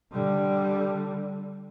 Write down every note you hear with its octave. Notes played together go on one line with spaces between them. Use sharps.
D3 G3